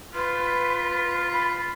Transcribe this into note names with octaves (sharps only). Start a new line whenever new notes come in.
F4 B4
B5